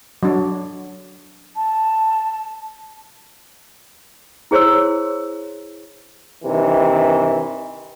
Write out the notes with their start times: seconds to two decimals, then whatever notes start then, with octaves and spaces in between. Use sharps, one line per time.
0.23 F#3 D4
1.56 A5
4.51 E4 G#4 C5 C#5 C6 E6
6.44 G2 C3 D#3 E3